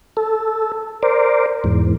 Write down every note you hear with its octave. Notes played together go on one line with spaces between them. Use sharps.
A4
A#4 C5 D5
E2 G#2